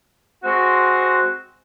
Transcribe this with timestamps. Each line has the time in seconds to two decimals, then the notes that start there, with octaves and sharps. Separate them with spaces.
0.44 G#3 C4 F#4